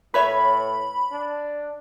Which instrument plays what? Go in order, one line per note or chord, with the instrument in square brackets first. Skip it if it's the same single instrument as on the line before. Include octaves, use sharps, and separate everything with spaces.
[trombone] A2 [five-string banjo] B4 C#5 E5 [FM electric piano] B5
[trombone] D4